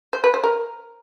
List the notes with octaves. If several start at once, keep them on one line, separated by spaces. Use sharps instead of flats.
C5
B4
C5
A#4